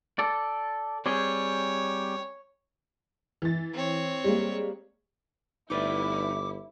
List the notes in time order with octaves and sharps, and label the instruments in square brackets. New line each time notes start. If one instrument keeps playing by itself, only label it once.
[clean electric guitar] A4 D5
[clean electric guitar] G3 C4 G#4 [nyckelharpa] C#5
[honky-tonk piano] E3 A6
[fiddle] C4 C#5
[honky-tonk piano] G3 G#3 A#3
[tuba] G1 [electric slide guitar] D#4 B4 D5 [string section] E4 [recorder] D6